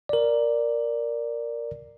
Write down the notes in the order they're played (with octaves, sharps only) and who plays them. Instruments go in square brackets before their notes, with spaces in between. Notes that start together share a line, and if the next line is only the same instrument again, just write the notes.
[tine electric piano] A#4 D5